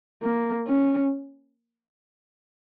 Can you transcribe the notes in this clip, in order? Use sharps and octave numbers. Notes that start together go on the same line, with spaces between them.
A#3
C#4